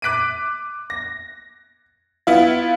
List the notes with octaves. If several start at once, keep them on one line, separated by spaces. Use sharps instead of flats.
D6 F#6 B6 D7 D#7
A#6
B3 E4 F4